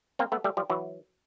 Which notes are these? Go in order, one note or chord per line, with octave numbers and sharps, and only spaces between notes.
A#3 C4
A3 B3
G3 A3
F3 G3
E3 F#3